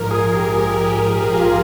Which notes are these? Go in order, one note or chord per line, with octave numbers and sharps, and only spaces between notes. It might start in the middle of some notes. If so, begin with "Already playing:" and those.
Already playing: A#1 G#2 F3 A#4
G#4
G4
G#4
A#4
G#4
G4
F4